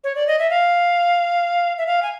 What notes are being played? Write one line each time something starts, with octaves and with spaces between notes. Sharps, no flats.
C#5
D5
D#5
E5
F5
E5
F5
G#5